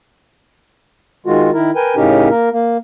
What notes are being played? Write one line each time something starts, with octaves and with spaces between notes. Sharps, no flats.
D#3 G#3 F4 F#4
D#3 E4 A#4
A#4 B4 G5 G#5
A2 C#3 C#4 D#4 G4 A#4
A#3 A#4
A#3